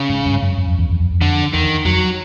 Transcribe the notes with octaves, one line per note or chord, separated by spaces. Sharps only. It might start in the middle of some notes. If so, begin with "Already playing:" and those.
Already playing: C#3
G#2
G2
F#2
F#2
F2
E2
F2
F2
F2
D3
E2 D#3
F2 F#3